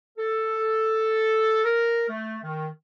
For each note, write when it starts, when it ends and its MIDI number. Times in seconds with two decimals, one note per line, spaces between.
0.18 1.63 69
1.64 2.05 70
2.09 2.38 57
2.44 2.67 51